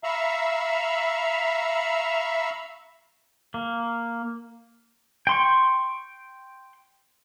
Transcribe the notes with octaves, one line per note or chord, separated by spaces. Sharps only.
E5 F5 A#5 B5 C#6 E6
A#3
G5 C6 C#6